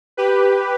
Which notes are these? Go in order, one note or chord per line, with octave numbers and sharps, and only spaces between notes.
G4 B4